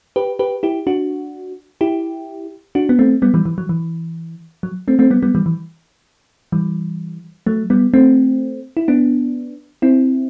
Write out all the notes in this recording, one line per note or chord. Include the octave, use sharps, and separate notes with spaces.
G4 B4
G4 B4
E4 G4
D4 F#4
E4 G4
D4 F#4
B3
A3 C4
G3 B3
E3 G3
E3
F#3
E3
F#3
A3 C4
A3 C4
G3 B3
G3 B3
E3 G3
E3
E3 G3
F#3 A3
G3 B3
A3 C4
E4
B3 D4
C4 E4